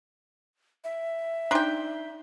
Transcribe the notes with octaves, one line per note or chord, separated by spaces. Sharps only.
E5
D4 D#4 G5 C6